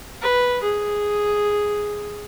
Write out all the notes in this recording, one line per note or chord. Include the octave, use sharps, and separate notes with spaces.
B4
G#4